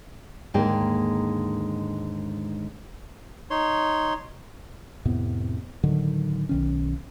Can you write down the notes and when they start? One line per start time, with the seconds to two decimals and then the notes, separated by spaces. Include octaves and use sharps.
0.54 D#2 G#2 D3 G#3 A#3 G5
3.50 D#4 C#5 C6
5.05 F2 A2 C3 B3
5.84 A2 D3 D#3 F#3
6.49 B1 D#3 C#4